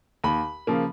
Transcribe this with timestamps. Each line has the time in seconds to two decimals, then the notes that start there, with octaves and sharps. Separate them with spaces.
0.24 D#2 B5
0.67 C#3 F3 A#3